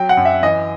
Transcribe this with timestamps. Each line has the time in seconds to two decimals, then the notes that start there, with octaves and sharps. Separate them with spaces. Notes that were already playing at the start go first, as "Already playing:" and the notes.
Already playing: F#3 G5
0.09 F#5
0.17 F#2
0.25 E5
0.43 E3 D#5